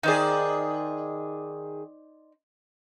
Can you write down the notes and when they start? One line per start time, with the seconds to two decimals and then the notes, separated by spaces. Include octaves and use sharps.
0.03 D#3 D#4 G#4 C5 D5